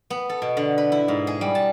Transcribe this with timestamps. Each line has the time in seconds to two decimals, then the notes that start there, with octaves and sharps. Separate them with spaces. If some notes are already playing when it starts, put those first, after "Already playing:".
0.10 B3
0.29 A4
0.42 B2
0.57 D3
0.78 B4
0.92 E4
1.08 G#2
1.27 G#4
1.41 G3
1.55 A5